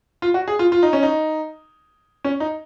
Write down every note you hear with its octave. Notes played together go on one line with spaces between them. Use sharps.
F4
F#4
G#4
F4
F4
D#4
C#4
D#4
C#4
D#4